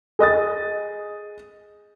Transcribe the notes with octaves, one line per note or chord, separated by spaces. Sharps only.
G#4 D#5 D#6 A6